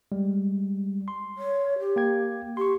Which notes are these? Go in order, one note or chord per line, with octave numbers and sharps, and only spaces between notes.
G3 G#3
C6
C#5
G4
A#3 G5 G#6
G4 C6 C#6